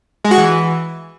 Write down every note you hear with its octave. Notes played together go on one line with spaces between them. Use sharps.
G#3
F#4
E3